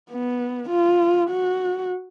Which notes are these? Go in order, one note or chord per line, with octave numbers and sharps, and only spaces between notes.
B3
F4
F#4